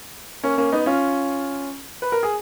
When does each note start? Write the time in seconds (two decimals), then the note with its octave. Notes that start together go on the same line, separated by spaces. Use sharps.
0.43 A#3 C#4
0.58 A#3 C#4
0.72 B3 D#4
0.86 C#4 F4
2.02 B4
2.12 A#4
2.23 G#4